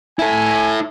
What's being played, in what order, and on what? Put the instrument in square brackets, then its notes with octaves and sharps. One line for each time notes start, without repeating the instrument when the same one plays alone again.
[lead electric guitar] E4 A4 [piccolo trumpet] G#5